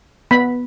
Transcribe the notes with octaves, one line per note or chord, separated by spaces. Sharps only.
B3 B5